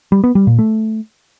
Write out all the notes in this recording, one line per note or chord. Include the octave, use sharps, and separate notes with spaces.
G3
B3
G3
A#2
A3